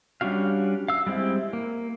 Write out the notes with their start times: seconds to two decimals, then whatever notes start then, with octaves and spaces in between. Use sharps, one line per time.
0.21 G3 C#4 D4 F#4 F5
0.88 F5 E6
1.07 G3 G#3 C4 E4
1.53 A#3